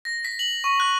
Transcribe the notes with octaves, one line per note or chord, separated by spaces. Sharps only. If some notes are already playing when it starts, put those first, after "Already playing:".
A#6
B6
F#7
C#6
F#6